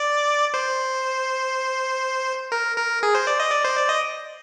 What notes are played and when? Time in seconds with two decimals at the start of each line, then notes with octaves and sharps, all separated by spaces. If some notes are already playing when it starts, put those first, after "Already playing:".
Already playing: D5
0.54 C5
2.52 A#4
2.77 A#4
3.03 G#4
3.15 C5
3.27 D5
3.40 D#5
3.51 D5
3.65 C5
3.77 D5
3.89 D#5